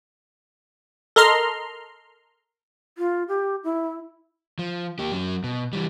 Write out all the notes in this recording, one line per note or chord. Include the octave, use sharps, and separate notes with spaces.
A4 A#4 D#5 A#5 C6 F6
F4
G4
E4
F3
A#3 G4
F#3 C#4
B2
E3 G3